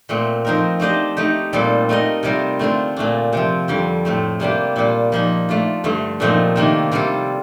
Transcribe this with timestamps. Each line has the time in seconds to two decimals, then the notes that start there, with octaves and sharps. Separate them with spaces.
0.09 A#2 A3 C4
0.45 F3 C4 D#4 A#4
0.80 A3 D4 G4 C5 D#5
1.17 A3 D#4 G4
1.53 A#2 G3 C4 F4 A4
1.89 A3 D#4 A#4 D#5
2.23 C3 G3 C4 F4 A#4
2.59 D3 A3 C4 F4
2.96 A#2 A3 D4
3.33 C3 F3 C4
3.68 F2 D3 G3
4.05 A2 A3 C4
4.40 C3 G3 A#3 D4 G4
4.76 A#2 G3 D4 F4
5.12 F3 A#3 D#4
5.49 A3 D4 F4
5.84 G2 D3 A3
6.20 A#2 F3 A3 C4 D#4
6.56 C3 D#3 A#3 D4
6.92 C3 G3 D4 F4 A4